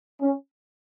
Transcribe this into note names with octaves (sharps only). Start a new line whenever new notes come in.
C#4